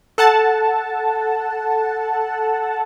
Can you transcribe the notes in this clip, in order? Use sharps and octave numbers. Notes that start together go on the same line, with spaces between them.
A4 F#5 A5